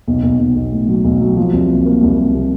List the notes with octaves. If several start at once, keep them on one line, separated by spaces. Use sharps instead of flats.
B1
B1
B1
B1
A2
F#3
B1
F#3
F3
C2
A#3
A#3
C2
A#3
C3